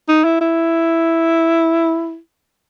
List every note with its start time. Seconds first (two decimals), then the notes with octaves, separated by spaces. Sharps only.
0.08 D#4
0.24 E4
0.41 E4